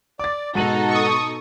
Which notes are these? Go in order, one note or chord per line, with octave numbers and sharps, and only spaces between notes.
D5 D6 A6
G#2 B2 D#4 F#4 A4 D#7 F#7
C#6 D#6